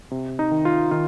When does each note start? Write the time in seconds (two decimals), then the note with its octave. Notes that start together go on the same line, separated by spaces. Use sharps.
0.11 C3
0.39 D#4
0.51 D#3
0.65 F4
0.91 D#3 F4